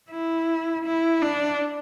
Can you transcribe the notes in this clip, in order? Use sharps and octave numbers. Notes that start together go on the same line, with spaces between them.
E4
E4
D4